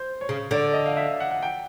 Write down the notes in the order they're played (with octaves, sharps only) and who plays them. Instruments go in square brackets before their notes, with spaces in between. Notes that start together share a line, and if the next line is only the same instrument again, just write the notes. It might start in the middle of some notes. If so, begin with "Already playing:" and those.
Already playing: [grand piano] C5
C#5
[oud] C#3
[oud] D3 [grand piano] D5
[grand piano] D#5
F5
E5
F#5
F#5
G5